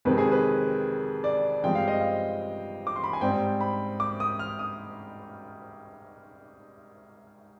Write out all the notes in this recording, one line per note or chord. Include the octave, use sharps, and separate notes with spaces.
F2 C3 D#3 G#3 B4
G#4
B4
D5
G2 F3 G#3 C4 G5
F5
D#5
F5
D6
C6
B5
G#5
G#2 G3 C4 G5
B5
D6
D#6
F6
D#6